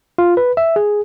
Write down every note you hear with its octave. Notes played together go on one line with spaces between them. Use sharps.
F4
B4
E5
G#4